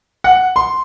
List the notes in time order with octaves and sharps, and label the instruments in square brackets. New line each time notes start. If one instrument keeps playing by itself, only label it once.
[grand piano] F#5
C6